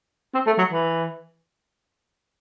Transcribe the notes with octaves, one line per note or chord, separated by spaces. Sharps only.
C4
A3
F#3
E3